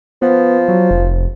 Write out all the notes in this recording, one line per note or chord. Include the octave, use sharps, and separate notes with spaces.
F3 B3
F#3
F1